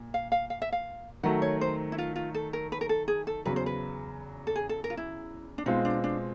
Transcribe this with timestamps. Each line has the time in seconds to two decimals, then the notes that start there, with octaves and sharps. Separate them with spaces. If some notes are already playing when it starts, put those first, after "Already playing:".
Already playing: A#2
0.14 F5
0.32 F5
0.50 F5
0.62 E5
0.72 F5
1.23 D#3 F#3 A3 F#5
1.42 C#5
1.61 C5
1.92 E4
1.98 F4
2.16 F4
2.34 A4
2.53 A#4
2.72 B4
2.81 A#4
2.89 A4
3.08 G#4
3.27 A4
3.45 E2 C#3 F#3 B4
3.56 C5
3.66 B4
4.47 A4
4.56 G#4
4.69 A4
4.84 A#4
4.90 F4
4.97 E4
5.58 D4
5.66 B2 G#3 C4 D#4 F4
5.85 D4
6.04 D4